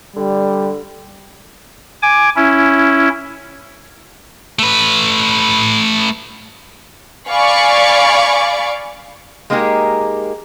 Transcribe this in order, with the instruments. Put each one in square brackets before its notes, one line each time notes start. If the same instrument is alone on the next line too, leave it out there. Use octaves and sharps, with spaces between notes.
[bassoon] D3 [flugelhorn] G3
[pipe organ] G#5 D6
C#4 E4
[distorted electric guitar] A3 B4
[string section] D5 F5 G#5 B5 C#6 D6
[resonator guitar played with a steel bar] G#3 A#3 D#4 G4 G#4 A#4